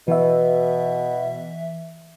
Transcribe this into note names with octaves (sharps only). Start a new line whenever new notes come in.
B2 E3 E5